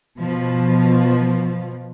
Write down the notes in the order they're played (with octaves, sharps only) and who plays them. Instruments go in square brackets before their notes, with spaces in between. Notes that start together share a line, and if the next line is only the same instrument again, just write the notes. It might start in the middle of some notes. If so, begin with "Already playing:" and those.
[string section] B2 F3